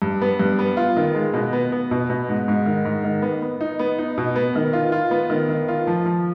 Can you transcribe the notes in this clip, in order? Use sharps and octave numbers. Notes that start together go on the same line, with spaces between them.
G2
B3
G2
B3
F4
D#3
G#3
B2
B3
B3
B2
B2
G#2
G#2
D#3
G#2
D#3
B3
B3
D#4
B3
D#4
B2
B3
D#3
F4
F4
B3
D#3
D#3
F4
F3
F3